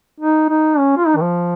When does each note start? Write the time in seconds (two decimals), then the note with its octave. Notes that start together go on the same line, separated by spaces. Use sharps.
0.20 D#4
0.49 D#4
0.78 C#4
0.97 F4
1.07 D#4
1.16 D#3
1.22 F3